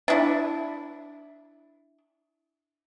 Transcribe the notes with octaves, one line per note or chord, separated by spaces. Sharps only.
D4 E4